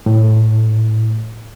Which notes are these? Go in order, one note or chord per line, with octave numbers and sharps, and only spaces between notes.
A2